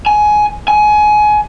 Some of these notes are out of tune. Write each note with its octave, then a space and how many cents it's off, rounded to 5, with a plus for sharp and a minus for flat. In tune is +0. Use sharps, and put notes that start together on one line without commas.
G#5 +15
G#5 +25